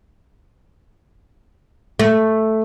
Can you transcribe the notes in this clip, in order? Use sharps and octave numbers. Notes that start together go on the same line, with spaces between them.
A3